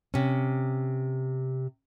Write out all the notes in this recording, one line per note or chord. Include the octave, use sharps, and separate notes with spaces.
C3 C#4